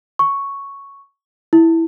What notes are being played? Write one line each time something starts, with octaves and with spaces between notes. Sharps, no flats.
C#6
E4